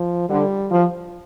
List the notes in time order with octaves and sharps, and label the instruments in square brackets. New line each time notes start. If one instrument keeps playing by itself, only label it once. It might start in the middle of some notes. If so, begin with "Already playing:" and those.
Already playing: [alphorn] F3
[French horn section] D3 [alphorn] G3
[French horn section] F3